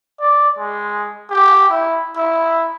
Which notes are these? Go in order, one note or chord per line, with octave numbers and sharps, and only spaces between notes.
D5
G#3
G4
E4
E4